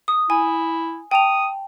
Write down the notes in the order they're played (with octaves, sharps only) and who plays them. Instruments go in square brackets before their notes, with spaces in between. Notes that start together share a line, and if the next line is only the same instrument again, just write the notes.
[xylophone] D#6
[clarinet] E4 [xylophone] G#5
[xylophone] G5 A5 F7 [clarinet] D#6